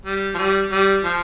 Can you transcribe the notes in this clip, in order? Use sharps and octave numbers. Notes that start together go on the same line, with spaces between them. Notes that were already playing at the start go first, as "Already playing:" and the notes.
G3
F3
G3
G3
F3